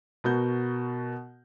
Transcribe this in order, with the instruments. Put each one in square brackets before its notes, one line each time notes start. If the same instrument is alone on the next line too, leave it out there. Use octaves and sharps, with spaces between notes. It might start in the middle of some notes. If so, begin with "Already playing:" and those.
[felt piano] B2 B3 F#4 A#4 G6